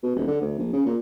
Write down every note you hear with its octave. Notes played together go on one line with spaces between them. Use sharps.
B2
D#1
D3
D2
A#1
C#3
A#2